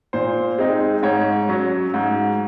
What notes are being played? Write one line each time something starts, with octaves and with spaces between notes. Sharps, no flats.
A#2 C5
G#3 C4 D#4
G#2 C#5
F#3 C#4
G#2